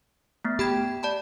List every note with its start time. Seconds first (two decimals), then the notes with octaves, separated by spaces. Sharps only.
0.45 A3 B3
0.59 G4 G5 B5 G#6
1.03 D5 A5 B5